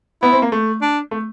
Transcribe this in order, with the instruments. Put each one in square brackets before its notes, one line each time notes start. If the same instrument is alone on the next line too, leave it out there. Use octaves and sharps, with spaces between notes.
[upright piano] B3 [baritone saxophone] E4
[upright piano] C4
A#3
A3
[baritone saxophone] D4
[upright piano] A3